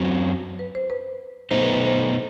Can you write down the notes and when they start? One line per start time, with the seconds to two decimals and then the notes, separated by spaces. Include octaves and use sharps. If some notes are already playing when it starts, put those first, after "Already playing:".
Already playing: F#2 F#3 C4 B4
0.59 B4
0.75 C5
0.90 B4
1.51 B2 A3 D#4 C5
1.63 B4
1.74 B4
1.86 C5